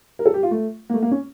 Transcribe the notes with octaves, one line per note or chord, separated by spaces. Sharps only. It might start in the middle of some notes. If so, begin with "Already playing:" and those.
A#4
A4
G4
F4
A3
A#3
A3
A#3
C#4